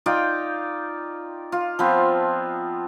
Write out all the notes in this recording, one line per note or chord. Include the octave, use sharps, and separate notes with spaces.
D#4 F4 D5 G5
F4
F3 B3 C4